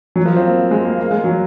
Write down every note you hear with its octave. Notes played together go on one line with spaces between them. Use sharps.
F#3
F3
C4
A#3
A#3
G#3
A#3
A#3
G#3
F#3